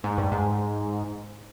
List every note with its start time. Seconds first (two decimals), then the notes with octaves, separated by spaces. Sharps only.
0.04 G#2
0.18 G2
0.32 G#2